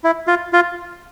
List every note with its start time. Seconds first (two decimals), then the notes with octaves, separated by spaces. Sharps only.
0.04 E4
0.27 F4
0.53 F4